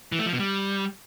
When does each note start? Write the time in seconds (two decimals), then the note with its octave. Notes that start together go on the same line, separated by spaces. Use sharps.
0.12 E3
0.19 A3
0.26 F3
0.33 B2
0.40 G3